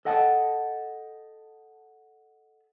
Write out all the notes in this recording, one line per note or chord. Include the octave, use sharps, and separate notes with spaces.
A4 D#5 F#5 G5 A5